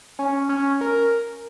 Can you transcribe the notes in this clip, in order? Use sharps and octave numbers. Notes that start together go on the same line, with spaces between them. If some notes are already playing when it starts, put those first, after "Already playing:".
C#4
C#4
A#4